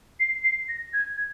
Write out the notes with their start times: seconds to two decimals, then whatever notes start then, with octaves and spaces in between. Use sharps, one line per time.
0.20 C7
0.44 C7
0.69 A#6
0.93 G#6
1.17 G#6